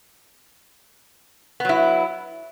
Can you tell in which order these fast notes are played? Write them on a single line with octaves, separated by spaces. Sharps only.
B3 F#3 E4